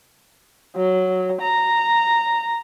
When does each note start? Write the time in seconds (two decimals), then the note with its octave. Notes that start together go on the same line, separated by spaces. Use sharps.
0.76 F#3
1.41 A#5